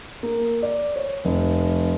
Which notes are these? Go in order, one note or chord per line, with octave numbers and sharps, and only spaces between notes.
A#3
D5
C#5
F1